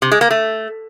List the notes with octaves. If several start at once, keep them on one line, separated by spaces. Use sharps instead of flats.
C3
G#3
A#3
A3